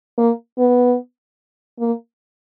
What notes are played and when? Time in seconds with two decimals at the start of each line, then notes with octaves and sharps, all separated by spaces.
0.18 A#3
0.59 B3
1.80 A#3